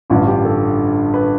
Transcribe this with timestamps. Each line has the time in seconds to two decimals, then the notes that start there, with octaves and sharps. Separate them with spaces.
0.10 A1 G2 D3 F4
0.27 G4
0.45 A4
1.14 B4